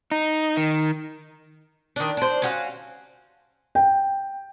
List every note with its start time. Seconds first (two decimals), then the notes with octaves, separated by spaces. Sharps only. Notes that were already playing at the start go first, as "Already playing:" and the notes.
0.12 D#4
0.57 D#3
1.96 D#3 D4
2.17 D4 C5
2.42 C#4 F#4 F5
3.75 G5